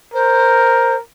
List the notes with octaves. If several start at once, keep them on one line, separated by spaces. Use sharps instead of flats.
A#4 C5